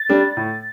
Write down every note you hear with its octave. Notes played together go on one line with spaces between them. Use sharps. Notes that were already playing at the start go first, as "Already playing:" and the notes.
Already playing: A6
G3 D4
A2